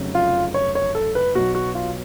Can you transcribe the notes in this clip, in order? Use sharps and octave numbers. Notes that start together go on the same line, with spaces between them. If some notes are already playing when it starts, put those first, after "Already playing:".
Already playing: F1 F2 C#3 F#3
F4
C#5
C#5
A4
B4
B1 B2 F#3 F#4
F#4
F4